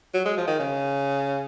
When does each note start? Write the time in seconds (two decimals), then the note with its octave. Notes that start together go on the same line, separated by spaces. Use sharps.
0.14 F#3
0.25 G#3
0.37 F3
0.47 D#3
0.59 C#3